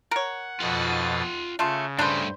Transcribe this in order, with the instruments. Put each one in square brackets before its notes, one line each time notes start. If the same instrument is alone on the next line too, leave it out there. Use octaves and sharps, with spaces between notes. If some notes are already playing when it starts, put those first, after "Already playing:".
[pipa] A#4 C#5 [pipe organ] F#5
[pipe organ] F2 B2 A6 [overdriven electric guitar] F4 F#5
[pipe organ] C#3 [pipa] A3 F4 A4
[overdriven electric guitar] G2 A3 [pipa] D4 B4 C5